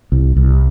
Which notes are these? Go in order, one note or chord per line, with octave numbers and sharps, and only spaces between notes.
C2
C2